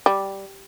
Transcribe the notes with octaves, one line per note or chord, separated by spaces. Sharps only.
G3